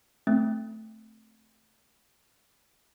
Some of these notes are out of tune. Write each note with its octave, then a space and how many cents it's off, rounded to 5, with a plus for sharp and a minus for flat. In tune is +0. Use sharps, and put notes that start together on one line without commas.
A3 +0 C4 +0